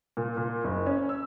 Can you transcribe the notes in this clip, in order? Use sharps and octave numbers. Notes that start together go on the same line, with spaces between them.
A#2
A#2
F#1
C#4
E6